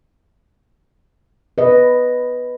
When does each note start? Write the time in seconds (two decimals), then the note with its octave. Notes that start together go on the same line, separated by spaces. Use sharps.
1.58 B4 D#5